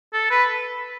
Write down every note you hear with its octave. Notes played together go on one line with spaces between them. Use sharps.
A4
B4